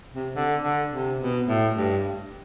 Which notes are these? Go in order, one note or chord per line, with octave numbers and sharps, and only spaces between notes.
C3
D3
D3
C3
B2
A2
G2